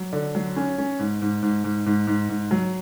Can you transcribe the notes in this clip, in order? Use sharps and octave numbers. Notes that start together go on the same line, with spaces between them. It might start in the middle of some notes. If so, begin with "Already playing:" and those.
Already playing: F#3
D3
F#3
C#4
C#4
G#2
G#2
G#2
G#2
G#2
G#2
G#2
F#3